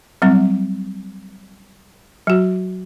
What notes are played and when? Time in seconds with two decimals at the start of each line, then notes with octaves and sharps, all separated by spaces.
0.22 F#3 G3 C4
2.27 F#3 F#4